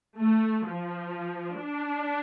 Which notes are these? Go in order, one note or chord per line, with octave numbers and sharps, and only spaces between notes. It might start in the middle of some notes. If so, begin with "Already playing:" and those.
A3
F3
D4